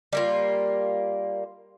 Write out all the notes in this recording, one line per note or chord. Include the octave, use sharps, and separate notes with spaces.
G3 A#3 F4